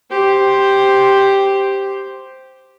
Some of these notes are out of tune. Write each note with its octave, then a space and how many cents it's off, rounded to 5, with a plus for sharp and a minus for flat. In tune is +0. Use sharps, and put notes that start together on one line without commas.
G4 +0 C5 +0